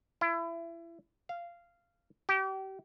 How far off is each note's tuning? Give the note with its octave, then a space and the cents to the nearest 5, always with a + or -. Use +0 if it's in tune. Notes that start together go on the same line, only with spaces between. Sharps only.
E4 +30
F5 -15
G4 -35